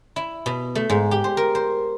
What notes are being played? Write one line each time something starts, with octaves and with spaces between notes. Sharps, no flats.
E4
B2
A3
G#2
G4
C5
A#4
C5